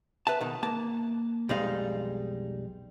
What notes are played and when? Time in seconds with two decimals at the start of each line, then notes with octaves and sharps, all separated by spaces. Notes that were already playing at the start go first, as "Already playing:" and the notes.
0.27 B4 E5 A5
0.40 B2 D#3
0.63 A#3 A5
1.49 B1 F2 G3 G#3 D#4 F5